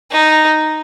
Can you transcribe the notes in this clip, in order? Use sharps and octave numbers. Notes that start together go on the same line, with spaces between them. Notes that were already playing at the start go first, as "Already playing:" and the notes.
D#4